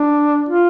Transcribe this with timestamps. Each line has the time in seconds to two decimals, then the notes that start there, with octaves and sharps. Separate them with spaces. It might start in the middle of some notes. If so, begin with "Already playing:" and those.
Already playing: D4
0.49 F4